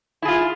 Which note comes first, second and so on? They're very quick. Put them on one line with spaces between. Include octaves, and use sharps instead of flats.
E4 G#4 F4